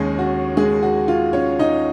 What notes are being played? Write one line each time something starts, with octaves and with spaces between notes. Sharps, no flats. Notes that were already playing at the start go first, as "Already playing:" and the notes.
Already playing: D#2 D#3 G#3 A#3 C#4 G#4
F#4
G#3 G#4
F#4
F4
C#4 C#5
D#4 D#5